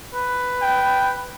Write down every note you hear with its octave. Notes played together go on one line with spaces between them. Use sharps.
B4
G5